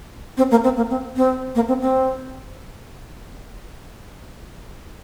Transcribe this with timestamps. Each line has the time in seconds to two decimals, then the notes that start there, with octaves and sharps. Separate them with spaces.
0.37 C4
0.51 A#3
0.64 C4
0.77 A#3
0.90 C4
1.16 C4
1.55 A#3
1.68 C4
1.81 C4